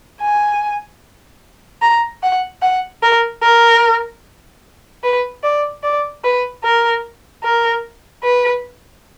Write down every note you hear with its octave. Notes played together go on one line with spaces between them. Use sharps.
G#5
A#5
F#5
F#5
A#4
A#4
B4
D5
D5
B4
A#4
A#4
B4